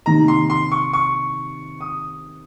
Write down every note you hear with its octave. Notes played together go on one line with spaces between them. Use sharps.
C3 D#3 A#3 D#4 A#5
C6
C6
C#6
C#6
D#6